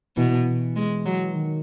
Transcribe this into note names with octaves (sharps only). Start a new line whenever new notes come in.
B2 E3
G#3
F#3
D#3